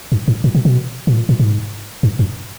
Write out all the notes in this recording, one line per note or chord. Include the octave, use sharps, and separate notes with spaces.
G2
G#2
A2
B2
B2
A#2
A2
A#2
A2
G#2
G2
F#2